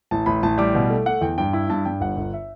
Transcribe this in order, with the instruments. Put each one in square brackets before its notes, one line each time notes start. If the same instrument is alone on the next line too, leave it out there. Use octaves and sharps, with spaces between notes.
[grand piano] A1 A5
A1 B5
A1 A5
G3 D6
B2
A3
A3 F#5
E2 G5
G2 G5
E4
G2 A5
G2 G5
G1 F#5
G1
E5